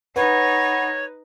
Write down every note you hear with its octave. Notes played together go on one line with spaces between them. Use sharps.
D#4 B4 C#5 F#5 B5